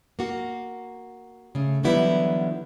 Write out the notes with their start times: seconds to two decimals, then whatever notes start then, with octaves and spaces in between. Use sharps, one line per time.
0.19 A#3 F#4
1.55 C#3 A3
1.83 D3 E3 F#3 G3 B3 E4